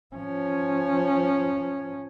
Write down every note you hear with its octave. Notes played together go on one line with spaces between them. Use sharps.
F3 C#4